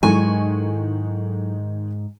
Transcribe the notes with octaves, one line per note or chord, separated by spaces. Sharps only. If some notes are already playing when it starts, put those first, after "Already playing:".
G#2 D#3 F#3 G#3 E4 A4 G#5 C#6